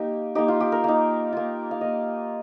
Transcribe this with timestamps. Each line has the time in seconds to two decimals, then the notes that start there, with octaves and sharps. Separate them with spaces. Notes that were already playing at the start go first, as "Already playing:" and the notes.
Already playing: A#3 D#4 G4
0.35 A#3 D#4 G4
0.48 F4
0.60 G4
0.72 A#4
0.84 A#3 D#4
1.33 A#3 F4
1.71 F5
1.81 A#3 F4 D#5